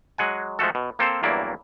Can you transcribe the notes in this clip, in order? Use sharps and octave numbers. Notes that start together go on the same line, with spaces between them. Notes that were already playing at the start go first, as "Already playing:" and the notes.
F#3 G#3 F#5 G#5
F3 G#3 A3 F#4 A4
B2
A#3 C4 A4 C5 F5
E2 G2 F#3 A#3 E4 D5